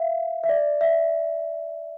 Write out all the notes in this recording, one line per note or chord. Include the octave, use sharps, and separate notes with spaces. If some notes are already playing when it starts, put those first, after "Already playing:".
Already playing: E5 F5
E5
D5
E5